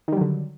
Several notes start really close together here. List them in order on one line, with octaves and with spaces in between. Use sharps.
D#3 G3 F#3 D3